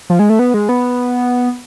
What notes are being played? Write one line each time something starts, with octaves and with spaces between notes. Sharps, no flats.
F3
G#3
A3
B3
G#3
B3